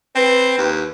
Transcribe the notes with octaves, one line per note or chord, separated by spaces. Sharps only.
C4 B4
D#2